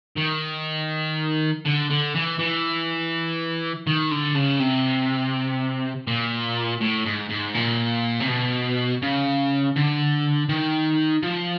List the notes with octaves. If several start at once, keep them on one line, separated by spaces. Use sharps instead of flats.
D#3
D3
D3
E3
E3
D#3
D3
C#3
C3
A#2
A2
G#2
G#2
A#2
C3
B2
C#3
D3
D#3
F3